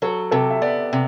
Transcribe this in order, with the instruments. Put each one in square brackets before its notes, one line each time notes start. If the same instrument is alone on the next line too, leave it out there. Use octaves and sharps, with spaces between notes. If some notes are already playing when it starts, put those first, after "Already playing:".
[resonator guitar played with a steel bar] F#3 [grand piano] A4
[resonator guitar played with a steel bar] C3 [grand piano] A4
[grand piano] E5
[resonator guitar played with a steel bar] B3 [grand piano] D5
[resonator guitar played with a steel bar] C3